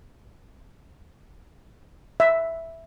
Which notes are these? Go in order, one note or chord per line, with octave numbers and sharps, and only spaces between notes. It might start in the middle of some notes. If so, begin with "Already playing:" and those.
E5